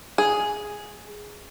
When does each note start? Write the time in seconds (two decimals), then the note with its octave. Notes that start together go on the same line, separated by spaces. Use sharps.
0.18 G#4